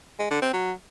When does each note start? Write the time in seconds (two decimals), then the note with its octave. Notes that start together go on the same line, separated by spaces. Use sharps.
0.19 G#3
0.31 D3
0.42 C4
0.53 F#3